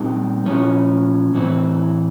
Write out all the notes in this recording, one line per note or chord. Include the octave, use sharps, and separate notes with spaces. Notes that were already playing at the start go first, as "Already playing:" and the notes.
Already playing: A#2 G3 C4 D#4 G4
A#2 F3 A3 C#4
A2 E3 A3 C4 E4